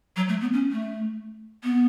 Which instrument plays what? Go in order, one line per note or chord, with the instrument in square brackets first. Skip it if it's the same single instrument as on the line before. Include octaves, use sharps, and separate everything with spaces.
[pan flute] F#3
A3
B3
C#4
A3
B3